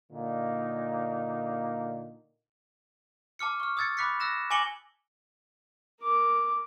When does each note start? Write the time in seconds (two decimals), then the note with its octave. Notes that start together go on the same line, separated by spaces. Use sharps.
0.12 A#2 D3 A#3 D#4
3.39 A5 D6 F6 C#7
3.60 C#6 F6
3.77 D#6 E6 G#6 A6 C#7
3.97 B5 D6 F#6 B6 C#7
4.20 E6 F#6 A#6 E7
4.50 G#5 D6 A#6 C#7 F#7 G7
6.01 A#4 D6